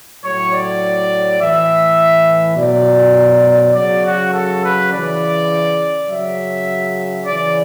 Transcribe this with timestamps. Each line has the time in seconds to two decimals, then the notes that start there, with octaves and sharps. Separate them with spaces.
0.23 A2 F#3 C#5
0.53 D5
1.41 A2 E3 E5
2.57 B2 F#3 D5
3.74 C#3 F#3 D5
4.04 F#4
4.33 A4
4.62 B4
4.91 C#3 E3 D5
6.08 C#3 F#3 E5
7.25 C#3 E3 D5